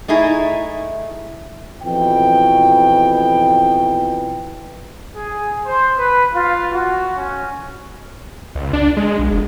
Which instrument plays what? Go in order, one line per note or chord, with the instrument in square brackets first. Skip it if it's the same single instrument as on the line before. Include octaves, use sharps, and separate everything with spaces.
[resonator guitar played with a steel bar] A3 D#4 E4 G#4
[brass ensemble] F2 B2 E3 G5
[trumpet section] G#4
C5
B4
F4
F#4
C#4
[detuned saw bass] C#2
D4
G#3
B1
F1